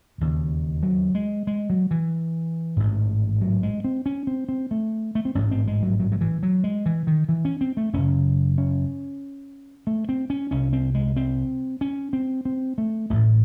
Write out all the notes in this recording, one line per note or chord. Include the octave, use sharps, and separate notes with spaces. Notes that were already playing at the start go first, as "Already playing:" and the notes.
E1 D#2 C#3
F#3
G#3
G#3
F#3
E3
A1 G#2
F#3
G#3
C4
C#4
C4
C4
A3
A3
C4
A1 G#2 C#4
C4
G#3
F#3
F#3
F#3
E3
F#3
G#3
E3
D#3
E3
C#4
C4
A3
F#1 F#2 C#3 C#4
C#4
A3
C4
C#4
C2 C3 C#4
C4
G#3
C4
C#4
C4
C4
A3
A1 A2 A3